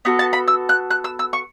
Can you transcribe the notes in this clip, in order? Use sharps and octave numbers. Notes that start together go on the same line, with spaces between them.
B3 F#4 A4 F#5
A5
B5
E6
F#6
F#6
E6
E6
C#6